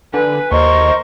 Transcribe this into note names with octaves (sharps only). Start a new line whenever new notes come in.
D3 B4 G#5
D#2 A#4 C5 D#5 C#6